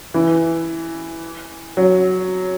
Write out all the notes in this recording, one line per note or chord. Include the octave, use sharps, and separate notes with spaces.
E3
F#3